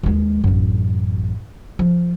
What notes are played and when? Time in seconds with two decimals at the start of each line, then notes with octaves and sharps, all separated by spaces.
0.03 D#2 G#3
0.44 A1 F#2
1.79 F3